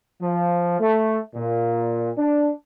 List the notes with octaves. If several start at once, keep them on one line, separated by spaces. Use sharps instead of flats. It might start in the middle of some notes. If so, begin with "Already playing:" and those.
F3
A3
A#2
D4